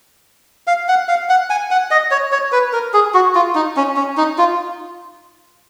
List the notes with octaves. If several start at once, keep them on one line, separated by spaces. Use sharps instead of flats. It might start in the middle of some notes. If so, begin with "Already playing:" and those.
F5
F#5
F5
F#5
G#5
F#5
D#5
C#5
C#5
B4
A#4
G#4
F#4
F4
D#4
C#4
C#4
D#4
F4